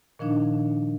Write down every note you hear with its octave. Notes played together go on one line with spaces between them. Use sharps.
A#2 D#3 F3 D4 D#4